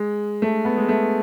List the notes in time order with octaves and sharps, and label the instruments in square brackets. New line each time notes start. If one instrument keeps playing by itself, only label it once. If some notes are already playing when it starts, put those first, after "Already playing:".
Already playing: [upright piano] G#3
A3
B3
G#3
A3